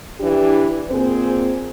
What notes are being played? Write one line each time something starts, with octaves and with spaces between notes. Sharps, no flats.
E3 D4 G4
A#2 C4 G#4 C5